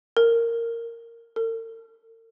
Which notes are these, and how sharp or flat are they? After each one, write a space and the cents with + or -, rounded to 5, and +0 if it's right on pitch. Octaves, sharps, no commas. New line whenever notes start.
A#4 -10
A#4 -45